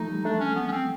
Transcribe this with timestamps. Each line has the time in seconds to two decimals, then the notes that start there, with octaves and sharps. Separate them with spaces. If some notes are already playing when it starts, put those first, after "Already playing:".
Already playing: E3 F3 A3 D#4
0.08 G3
0.25 A3 D4
0.40 C#4
0.56 B3
0.68 C#4
0.72 C4